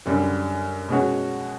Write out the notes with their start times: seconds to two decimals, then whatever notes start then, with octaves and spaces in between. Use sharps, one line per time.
0.06 F#2 D3 G3
0.88 B2 G#3 C#4 F#4